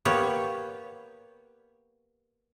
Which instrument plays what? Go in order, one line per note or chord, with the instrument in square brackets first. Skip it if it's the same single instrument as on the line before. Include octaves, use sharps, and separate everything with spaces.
[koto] A#3 B3 G4 C#5